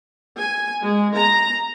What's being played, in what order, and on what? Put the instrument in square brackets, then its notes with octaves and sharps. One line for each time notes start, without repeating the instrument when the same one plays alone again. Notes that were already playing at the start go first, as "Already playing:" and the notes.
[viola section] G#5
G#3
A#5